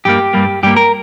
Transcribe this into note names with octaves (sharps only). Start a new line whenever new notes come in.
G2 G3 A#3 G4
G2 G3 A#3
G2 G3 A#3 G4
A#4